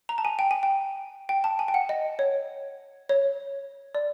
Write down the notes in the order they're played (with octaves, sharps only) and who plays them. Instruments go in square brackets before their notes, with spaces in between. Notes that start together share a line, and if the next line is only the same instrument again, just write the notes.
[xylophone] A#5
A5
G#5
G5
G#5
G5
G5
A5
G#5
G5
F#5
D#5
C#5
C#5
D5